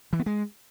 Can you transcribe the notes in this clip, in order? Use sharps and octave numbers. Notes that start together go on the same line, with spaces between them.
E3
B3
G#3